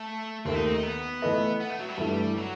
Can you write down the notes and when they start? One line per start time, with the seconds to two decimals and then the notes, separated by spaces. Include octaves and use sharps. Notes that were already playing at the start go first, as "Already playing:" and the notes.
Already playing: A3
0.45 D#2 D#3 A3 C4
0.54 D#4
0.65 C4
0.74 D#4
0.83 B3
1.22 E3 A3 E4 B4 D#5
1.60 B3
1.70 A3
1.79 F#3
1.88 G3
1.98 G2 E3 A3
2.37 F#3